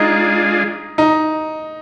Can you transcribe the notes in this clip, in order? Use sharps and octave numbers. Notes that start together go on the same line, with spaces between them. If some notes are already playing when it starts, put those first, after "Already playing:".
Already playing: G#3 D4 D#4 F4 G#4
D#4